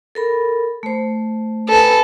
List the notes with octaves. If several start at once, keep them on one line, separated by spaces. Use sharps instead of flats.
A4 A#4 B5
A3 C5
A4 B4 G#5 B5